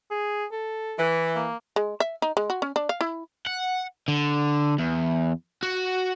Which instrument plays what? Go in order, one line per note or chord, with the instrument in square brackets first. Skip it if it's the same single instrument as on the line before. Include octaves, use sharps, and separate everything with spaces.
[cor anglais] G#4
A4
[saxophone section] E3
[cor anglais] A#3
[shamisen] G#3
E5
D#4
G#3
F#4
C#4
D4
F5
E4
[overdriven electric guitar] F#5
D3
E2
F#4